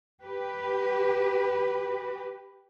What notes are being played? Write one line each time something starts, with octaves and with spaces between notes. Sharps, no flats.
G4 B4